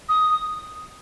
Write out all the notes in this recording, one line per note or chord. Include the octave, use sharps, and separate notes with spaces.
D#6